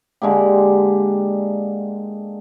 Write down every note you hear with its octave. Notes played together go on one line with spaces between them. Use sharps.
D3 G#3 A#3 G4